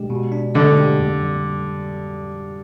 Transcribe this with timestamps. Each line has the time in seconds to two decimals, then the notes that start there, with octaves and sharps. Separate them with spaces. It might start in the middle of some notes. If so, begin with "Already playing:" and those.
Already playing: B2 G#3 D4 G4
0.10 B2
0.32 D4
0.55 D3 G#3
0.77 G4
0.99 F2
1.20 G3